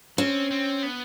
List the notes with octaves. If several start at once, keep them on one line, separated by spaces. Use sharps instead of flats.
C4 C#4
C4
B3